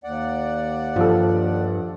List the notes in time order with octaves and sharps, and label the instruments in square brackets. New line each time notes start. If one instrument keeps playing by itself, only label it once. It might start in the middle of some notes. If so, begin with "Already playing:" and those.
[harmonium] D#2 D5 F#5
[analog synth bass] G2 [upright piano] F3 A4